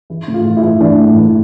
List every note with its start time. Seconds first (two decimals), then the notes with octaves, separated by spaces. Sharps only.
0.10 E3 E4
0.28 A2
0.34 F4
0.45 E3
0.57 E4
0.63 E3
0.80 E3 D4
0.99 A2
1.16 E3